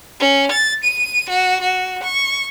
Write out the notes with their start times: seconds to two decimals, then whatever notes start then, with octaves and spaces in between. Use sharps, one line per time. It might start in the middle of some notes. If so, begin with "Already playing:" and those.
0.20 C#4
0.51 A6
0.83 D#7
1.29 F#4
1.62 F#4
2.03 C#6